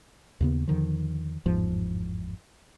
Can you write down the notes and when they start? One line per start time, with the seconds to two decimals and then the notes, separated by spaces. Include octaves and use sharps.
0.40 D#2 C#3 B3
0.68 E2 D3 D#3 F3
1.46 G1 E2 G#2 F3